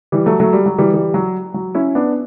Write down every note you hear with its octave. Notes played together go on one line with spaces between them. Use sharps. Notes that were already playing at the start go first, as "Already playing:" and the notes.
E3 G3
F#3 A3
F#3 A3
G3
F#3
E3 G3
E3 G3
F#3
F#3
C#4 E4
B3 D4